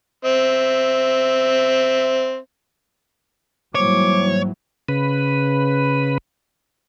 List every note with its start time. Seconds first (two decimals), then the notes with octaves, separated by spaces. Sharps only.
0.25 C4 E5
3.75 G#2 E3 F#3 G3 A#3 C5 C#5 D6
4.89 C#3 B4